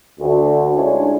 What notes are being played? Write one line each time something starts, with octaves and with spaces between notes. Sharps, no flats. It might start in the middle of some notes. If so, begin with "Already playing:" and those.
D2
G#3 C#4 D4 E4 F4 G#4